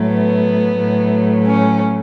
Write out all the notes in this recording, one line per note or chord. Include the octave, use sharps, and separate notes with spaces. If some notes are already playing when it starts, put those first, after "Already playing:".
Already playing: A2 F#3 A3
B3
A2 F#3 A3
C#4